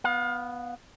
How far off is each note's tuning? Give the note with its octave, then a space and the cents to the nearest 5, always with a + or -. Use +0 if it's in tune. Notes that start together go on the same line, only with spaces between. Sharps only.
B3 +0 F5 +35